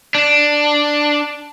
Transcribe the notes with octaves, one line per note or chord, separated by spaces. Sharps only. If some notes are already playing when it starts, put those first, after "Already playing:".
D4